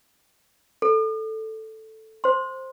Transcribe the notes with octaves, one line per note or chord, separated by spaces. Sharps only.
A4
C5 C6